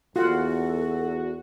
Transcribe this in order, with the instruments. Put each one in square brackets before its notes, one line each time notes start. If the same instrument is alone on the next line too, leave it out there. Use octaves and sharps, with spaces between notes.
[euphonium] E2 [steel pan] F4 F#5 [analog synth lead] F#4 [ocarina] A4